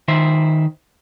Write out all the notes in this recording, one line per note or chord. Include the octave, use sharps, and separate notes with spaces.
D#3 C5 E5